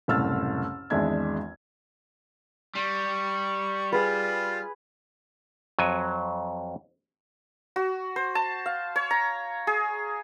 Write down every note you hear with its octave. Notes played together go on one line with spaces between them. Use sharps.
F#1 C2 A2 E6 F6 A6
G#1 E2 G#3 D4 E5 G#6
G3 C#6
F4 G#4 B4
F2 F#3 G#5
F#4
C5
A5
F5
C#5
A#5
G#4